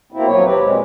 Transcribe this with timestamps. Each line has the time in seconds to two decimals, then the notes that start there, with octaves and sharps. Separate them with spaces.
0.13 B2 A#3 C4 E4
0.26 D#2 F3 F#3 C#5
0.44 C4 G4 B4
0.61 A#2 G#3